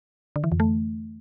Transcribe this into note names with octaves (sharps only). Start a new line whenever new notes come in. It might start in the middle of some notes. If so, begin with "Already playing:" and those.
D3
E3
F2
A3